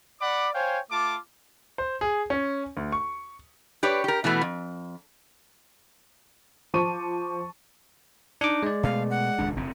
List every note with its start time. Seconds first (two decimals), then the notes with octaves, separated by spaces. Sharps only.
0.21 D5 F#5 B5 D6
0.54 C5 C#5 F5 G5 G#5
0.91 A3 F4 A5 D6
1.78 C5
2.01 G#4
2.30 C#4
2.77 D2
2.92 C#6
3.83 G4 B4 C#5 D5
4.04 G4 A#4
4.24 B2 E3 A3 B3
4.41 F2
6.74 F3 C5 A5 C#6 D6 D#7
8.41 D4 D#4 D6
8.63 G#3 D5
8.83 B2 A3 F5
9.10 F#5
9.39 D#1 C#2 D4
9.57 E1 C#3 C4